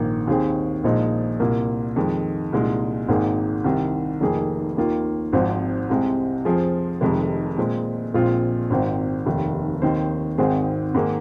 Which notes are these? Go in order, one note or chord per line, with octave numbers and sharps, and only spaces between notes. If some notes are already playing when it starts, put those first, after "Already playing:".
Already playing: A#1 G#2 D#3 A#3
D#2 D#3 C4 G#4
A#1 A#2 F3 G#3 D#4
C2 A#2 A#3
F2 D#3 G#3
C2 A#2 G#3 D#4
G#1 G#2 D#3 A#3 G#4
C2 C3 D#3
F1 F2 D#3 A#3 G#4
D#2 D#3 A#3 F4
G#1 G#2 F3 C4
C2 C3 G#3 C4 G#4
F2 F3 C4 F4 G#4
F1 F2 C3 D#3 G#3
A#2 G#3 C4
A#1 A#2 G#3 C4 F4
G#1 G#2 D#3 C4
F1 D#2 D#3
D#2 D#3 C4 D#4 C5
G#1 G#2 D#3 C4 G#4
G#2 D#3 A#3 G#4